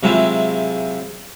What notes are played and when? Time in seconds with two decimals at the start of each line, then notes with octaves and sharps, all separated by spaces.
0.03 C3 F#3 G#3 E4 F4